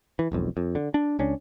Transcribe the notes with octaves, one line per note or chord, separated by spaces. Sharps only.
E3
E1 B1 F2
F2
D3
D4
C#2 C#4 D4